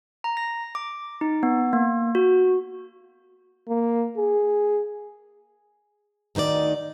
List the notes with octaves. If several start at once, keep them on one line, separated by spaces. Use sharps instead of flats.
A#5
A#6
D6
D#4
B3
A#3
F#4
A#3
G#4
D2 D#3 D#4 C5 D5